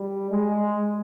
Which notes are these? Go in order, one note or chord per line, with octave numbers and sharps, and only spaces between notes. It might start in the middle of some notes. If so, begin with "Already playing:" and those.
Already playing: G3
G#3